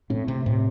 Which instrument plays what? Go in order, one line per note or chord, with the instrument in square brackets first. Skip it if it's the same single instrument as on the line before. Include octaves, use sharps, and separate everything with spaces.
[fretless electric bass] A2 [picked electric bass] A3 C4
[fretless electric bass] C3
[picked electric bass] A2 [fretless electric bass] C3